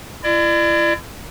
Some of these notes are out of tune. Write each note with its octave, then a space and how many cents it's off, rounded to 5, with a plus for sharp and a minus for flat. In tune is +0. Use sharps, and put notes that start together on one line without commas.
E4 +40 D5 +35